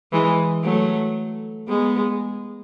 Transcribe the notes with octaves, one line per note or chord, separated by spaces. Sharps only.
E3 G#3
F#3 A3
G#3 B3